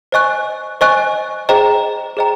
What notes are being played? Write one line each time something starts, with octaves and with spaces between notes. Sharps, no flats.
C5 D#5 G#5 C#6 F#6
C5 D#5 G#5 C#6 F#6
G#4 C5 D#5 G5 A#5
G#4 C5 D#5 G5 A#5